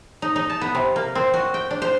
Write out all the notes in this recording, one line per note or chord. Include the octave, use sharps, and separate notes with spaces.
D#4
D#4
A5
B3
C3
A#3
C4
F#4
G5
D4
C5